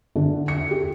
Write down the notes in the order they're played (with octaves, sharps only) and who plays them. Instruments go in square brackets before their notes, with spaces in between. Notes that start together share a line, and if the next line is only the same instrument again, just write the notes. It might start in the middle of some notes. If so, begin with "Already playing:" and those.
[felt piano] D3
C#7
G4